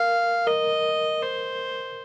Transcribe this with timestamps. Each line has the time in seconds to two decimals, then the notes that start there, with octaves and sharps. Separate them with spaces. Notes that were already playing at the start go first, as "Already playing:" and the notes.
Already playing: A#4 F5
0.47 A#4 D#5
1.23 C5